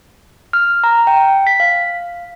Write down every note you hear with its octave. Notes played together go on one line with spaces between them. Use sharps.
F6
A#5
G5
B6
F5